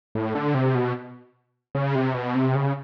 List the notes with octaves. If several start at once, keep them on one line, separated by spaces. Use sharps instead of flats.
A2
D3
C3
B2
C#3
C3
B2
C3
C#3